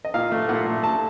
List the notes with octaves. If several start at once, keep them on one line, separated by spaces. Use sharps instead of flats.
D#5
A#2 F5
A3
A#2 F#5
A3
A3 A5